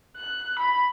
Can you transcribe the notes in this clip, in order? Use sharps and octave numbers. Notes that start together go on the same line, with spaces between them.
F#6
B5